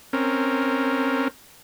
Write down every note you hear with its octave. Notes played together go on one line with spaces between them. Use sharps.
C4 C#4 A#4